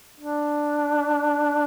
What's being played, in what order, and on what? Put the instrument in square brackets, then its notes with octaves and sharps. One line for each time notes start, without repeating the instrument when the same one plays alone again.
[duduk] D4